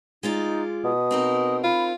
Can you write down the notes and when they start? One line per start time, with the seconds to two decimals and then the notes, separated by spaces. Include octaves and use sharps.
0.23 G#3 D#4 F4 D5
0.84 B2 D#6
1.11 C4 D#4 A#4
1.64 F4 B5